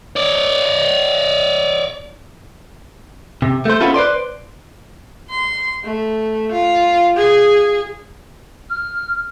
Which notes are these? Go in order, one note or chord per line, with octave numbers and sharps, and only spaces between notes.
C#5 D5
C3
A3 C5
B3 C#4 E4 F4 A4
B4 C5 D5 C6
C6
A3
F4
G#4
F6